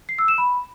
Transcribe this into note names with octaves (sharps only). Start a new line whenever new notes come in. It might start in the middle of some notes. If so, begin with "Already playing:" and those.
C7
E6
E7
B5